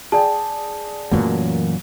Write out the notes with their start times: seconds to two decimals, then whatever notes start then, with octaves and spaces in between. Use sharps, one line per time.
0.12 G#4 D5 G5 A5
1.11 F#2 A#2 E3 F#3 A3